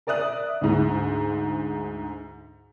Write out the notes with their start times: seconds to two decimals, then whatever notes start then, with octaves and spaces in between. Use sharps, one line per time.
0.07 A#4 D5 E5 D#6 F#6
0.61 D2 G#2